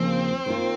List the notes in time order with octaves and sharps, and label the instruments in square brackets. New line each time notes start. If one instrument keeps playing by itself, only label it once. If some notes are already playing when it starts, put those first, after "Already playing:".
Already playing: [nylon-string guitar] D#2 C#3 F3 A#3 F4 [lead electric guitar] C4
[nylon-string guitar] D#3 A#3 F4